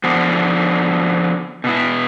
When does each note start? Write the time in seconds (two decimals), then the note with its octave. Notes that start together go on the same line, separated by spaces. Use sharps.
0.04 D3 F3 B3
1.64 B2 B3 E4